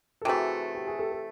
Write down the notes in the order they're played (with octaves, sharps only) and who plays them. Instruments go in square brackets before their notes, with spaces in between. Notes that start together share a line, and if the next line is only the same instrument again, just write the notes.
[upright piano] A4
[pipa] C3 E3 A3 [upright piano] F#4 G#4
[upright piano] G4
G#4
G4 A4
A4